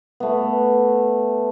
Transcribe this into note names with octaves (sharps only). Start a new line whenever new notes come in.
A3 B3